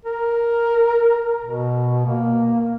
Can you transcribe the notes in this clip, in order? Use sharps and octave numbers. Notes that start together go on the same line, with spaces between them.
A#4
B2
A#3